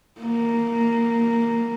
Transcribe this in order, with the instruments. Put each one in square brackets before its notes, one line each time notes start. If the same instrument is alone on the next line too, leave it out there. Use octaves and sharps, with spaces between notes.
[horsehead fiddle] A#3